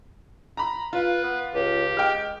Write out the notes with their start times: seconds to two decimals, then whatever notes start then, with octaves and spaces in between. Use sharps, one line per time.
0.57 A#5 B5
0.93 F4 B4
1.23 B3
1.54 C#2 G4
1.97 G#3 G5 F6